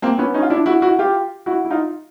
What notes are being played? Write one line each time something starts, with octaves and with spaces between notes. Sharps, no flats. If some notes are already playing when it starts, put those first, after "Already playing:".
A#3 C4
B3 C#4
C#4 D#4
F4
D4 E4
E4 F#4
E4 F#4
F4 G4
E4 F#4
E4
D#4 F4